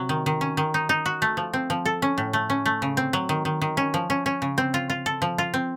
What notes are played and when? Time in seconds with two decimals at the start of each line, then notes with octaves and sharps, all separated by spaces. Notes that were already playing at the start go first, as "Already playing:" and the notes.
Already playing: C3 F#3
0.09 D#3
0.26 D#3
0.41 C#4
0.57 D#3
0.74 D#4
0.89 D#4
1.06 F#4
1.22 A3
1.37 F3
1.53 C4
1.70 F3
1.85 A4
2.02 C#4
2.18 A2
2.33 A3
2.50 C#4
2.66 A3
2.82 C#3
2.97 C4
3.13 F#3
3.29 D#3
3.45 D#3
3.61 D#3
3.77 C#4
3.94 F3
4.10 C#4
4.26 C#4
4.42 C#3
4.58 C4
4.74 F4
4.90 F4
5.06 A4
5.22 F3
5.38 F4
5.54 C4